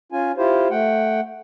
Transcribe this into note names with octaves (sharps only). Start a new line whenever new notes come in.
C#4 F4 G#5
E4 F4 G4 C5
A3 F#5 G5